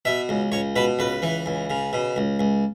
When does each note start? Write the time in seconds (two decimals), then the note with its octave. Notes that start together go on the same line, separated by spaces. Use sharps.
0.05 B2 E5
0.29 C#2
0.52 C#2 C#5
0.76 B2 B4
0.99 C#2 B4
1.22 E3
1.46 C#2
1.70 C#3
1.93 B2
2.16 C#2
2.39 C#2